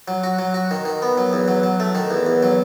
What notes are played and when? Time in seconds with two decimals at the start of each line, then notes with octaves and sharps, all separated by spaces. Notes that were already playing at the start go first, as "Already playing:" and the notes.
0.08 F#3
0.24 F#4
0.39 F#3
0.54 F#4
0.71 D#3
0.85 D#3
1.02 B3
1.18 F#3
1.33 E2
1.48 F#3
1.63 F#3
1.80 A3
1.95 D#3
2.11 E2
2.26 E2
2.43 F#3